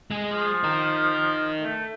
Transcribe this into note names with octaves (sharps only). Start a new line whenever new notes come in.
G#3 G#4
F3
D#4 A#4
A3